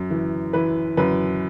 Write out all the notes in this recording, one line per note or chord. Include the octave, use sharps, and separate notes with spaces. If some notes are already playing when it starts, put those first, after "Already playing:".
Already playing: F#2
E3
E3 B4
F#2 B4